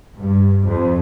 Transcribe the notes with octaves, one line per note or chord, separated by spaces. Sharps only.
G2
F2